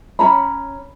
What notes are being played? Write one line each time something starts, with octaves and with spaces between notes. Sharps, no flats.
C#4 A#5 B5